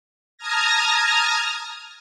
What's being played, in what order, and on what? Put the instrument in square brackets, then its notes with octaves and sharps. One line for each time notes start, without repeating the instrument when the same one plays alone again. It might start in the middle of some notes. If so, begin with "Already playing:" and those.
[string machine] A5 A#5 D#6 F6 G#6 A#6